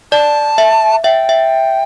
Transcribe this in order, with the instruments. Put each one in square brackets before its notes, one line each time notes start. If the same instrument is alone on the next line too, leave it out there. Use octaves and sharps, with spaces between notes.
[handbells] D5 [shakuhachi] A5
[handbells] E5
[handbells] E5 [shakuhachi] G5
[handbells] E5